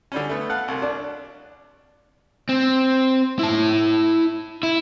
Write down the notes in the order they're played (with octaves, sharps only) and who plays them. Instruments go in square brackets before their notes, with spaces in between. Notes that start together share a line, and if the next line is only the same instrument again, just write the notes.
[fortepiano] D3 G3 C#4
A3 B3
A4 F5 F#5
C2
D4
[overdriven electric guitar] C4
E4 A5
E4